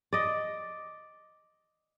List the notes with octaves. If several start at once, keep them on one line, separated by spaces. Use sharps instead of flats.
D5 D#5